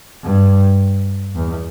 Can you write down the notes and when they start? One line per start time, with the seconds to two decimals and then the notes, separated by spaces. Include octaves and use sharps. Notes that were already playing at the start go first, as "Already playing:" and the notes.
0.23 G2
1.35 E2